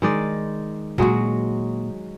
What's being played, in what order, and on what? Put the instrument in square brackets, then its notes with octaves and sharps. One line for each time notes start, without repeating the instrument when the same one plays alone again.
[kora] D#3 G#3 D5
[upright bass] A#2 A#3 [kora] F#3 G#3 F#4